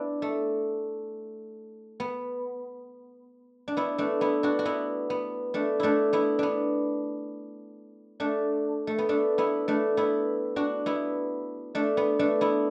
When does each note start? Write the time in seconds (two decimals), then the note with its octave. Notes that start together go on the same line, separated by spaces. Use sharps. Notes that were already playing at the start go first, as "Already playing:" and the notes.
Already playing: B3 D4 E4
0.22 A3
2.00 B3
3.68 D4
3.77 B3 E4
3.98 A3 D4
4.21 B3 E4
4.43 D4 F#4
4.59 F#4
4.65 B3 E4
5.10 B3
5.54 A3 D4
5.80 A3 D4 E4
6.13 B3 E4
6.39 B3 D4
8.20 A3 D4
8.87 A3
8.98 B3
9.09 A3 D4
9.38 B3 E4
9.68 A3 D4
9.97 B3 E4
10.56 D4 F#4
10.86 B3 E4
11.75 A3 D4
11.97 B3
12.19 A3 D4
12.41 B3 E4